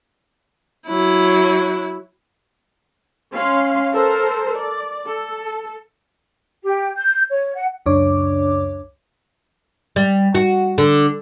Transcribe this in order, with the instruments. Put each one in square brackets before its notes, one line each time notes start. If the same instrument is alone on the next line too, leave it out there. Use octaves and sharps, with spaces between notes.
[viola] F#3 E4
[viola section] C#4 F5 C6
A4 A#4 C5
D5
A4
[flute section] G4
G6
C#5
F#5
[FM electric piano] C#2 F#2 C#3 D4 C#5 D6
[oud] G3
F#4
D3